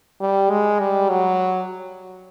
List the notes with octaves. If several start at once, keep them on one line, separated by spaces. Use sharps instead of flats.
G3
G#3
G3
F#3